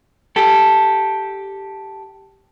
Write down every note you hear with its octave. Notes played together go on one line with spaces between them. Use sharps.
G4 A4